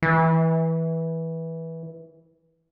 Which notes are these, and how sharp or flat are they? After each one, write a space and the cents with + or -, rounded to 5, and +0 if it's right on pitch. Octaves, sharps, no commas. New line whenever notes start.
E3 -15